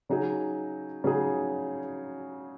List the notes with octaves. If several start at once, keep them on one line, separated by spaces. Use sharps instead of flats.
C#3 F#3 D#4 G#4
C#3 F#3 D#4 G#4